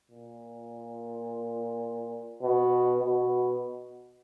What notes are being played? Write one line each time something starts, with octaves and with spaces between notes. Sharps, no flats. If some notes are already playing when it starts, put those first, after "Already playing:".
A#2
B2
B2